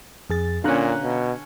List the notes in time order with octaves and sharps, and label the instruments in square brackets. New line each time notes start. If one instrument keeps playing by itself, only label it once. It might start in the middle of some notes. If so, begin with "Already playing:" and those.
[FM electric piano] F2 G#4 A6
[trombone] A#2 [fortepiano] D3 C#4 [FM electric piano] F5 A#5 F#6
[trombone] B2